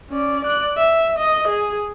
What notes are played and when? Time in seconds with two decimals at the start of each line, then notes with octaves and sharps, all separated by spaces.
0.10 C#4 D5
0.45 D5 F#6
0.77 E5
1.19 D#5
1.48 G#4